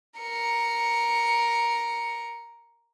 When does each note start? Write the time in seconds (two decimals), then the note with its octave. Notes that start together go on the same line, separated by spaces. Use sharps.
0.20 A#4 C#7